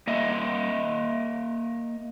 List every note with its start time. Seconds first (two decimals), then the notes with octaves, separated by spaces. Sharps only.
0.07 A#3 D#5 E5